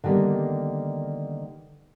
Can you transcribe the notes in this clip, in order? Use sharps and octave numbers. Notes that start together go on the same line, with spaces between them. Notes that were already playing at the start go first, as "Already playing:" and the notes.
D3 D#3 G3 A#3 B3